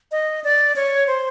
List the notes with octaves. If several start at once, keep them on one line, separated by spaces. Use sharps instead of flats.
D#5
D5
C#5
C5